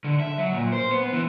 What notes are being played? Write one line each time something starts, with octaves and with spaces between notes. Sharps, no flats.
D3
E5
F#3
A#2
C5
B3
E3